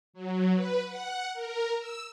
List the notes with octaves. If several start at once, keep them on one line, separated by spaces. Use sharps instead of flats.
F#3
B4
F#5
A#4
E6